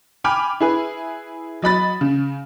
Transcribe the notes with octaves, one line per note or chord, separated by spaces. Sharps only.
G5 G#5 B5 D6 F6
E4 G#4 B4
F#3 D#5 B5 A6
C#3